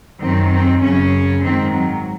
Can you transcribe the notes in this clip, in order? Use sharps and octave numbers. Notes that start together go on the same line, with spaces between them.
F#2 D#3 C4
C4
F#2 C#3 C#4
G#2 D#3 C4
F#3